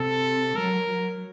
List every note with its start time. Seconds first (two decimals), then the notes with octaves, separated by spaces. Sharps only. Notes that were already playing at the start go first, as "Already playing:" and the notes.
Already playing: C3 A4
0.56 F#3 A#4
0.89 F#3